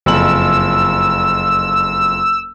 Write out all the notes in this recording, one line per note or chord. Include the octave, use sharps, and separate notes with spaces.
F#1 F2 E6 F#7